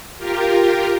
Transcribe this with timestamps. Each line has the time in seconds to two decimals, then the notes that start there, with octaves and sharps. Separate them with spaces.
0.17 F4 G4 A#4